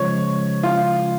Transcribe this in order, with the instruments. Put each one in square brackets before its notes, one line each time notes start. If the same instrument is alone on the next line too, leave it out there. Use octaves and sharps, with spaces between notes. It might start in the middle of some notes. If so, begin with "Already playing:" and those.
Already playing: [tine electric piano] C#3 F3 G#3 [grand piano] C#5
[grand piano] F4